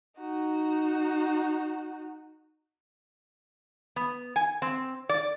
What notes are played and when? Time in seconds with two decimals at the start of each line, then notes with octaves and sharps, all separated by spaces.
0.19 D#4 F#4
3.96 B3
4.36 G#5
4.62 C4
5.09 D5